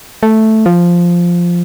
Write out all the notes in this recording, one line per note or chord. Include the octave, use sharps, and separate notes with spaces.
A3
F3